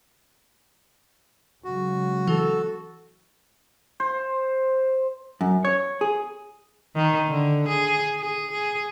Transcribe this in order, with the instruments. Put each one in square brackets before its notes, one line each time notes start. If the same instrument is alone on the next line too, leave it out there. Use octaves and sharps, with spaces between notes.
[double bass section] C#3 F#3 G#3 [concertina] F#4
[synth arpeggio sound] E3 [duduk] A4
[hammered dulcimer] C5
[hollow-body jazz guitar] F#2
C#5
G#4
[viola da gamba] D#3
D3
G#4
G#4
G#4